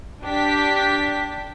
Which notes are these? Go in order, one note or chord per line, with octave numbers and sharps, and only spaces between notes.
D4 G4 B6